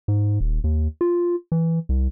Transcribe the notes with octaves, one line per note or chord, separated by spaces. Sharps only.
G#2
D#1
D#2
F4
E3
C2